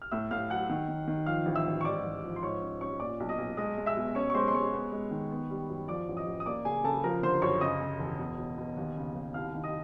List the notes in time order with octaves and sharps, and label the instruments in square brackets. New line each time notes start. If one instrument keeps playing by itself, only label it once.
[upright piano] F6
A2 E5 E6
A2 F5 F6
F#3 F#5 F#6
D#3
D#3
D#3
F3 F5 F6
A1
E5 E6
A1
C#6
G#2 D5 D6
A1
F3
C6
G#2 C#5 C#6
C#4
C#4 C#5 C#6
A#2 D5 D6
B1
D#5 D#6
B1
G#3 D#5 D#6
G#3
E5 E6
B2
C#4 C#5 C#6
C#6
G#3 C5 C6
C6
G#3 C#5 C#6
B3
G#3
D#3
B3
G3
F#2
F3 D5 D6
A1
D#5 D#6
A1
D#6
A#3 D5 D6
C#3 G#4 G#5
C#3 A4 A5
F3 A#4 A#5
D3 C5 C6
F#2 C#5 C#6
C#3 D#5 D#6
C#3
E1
B2
B2
B2
D#2
C#3
D#2
C2 F5 F6
D#3
D#5 D#6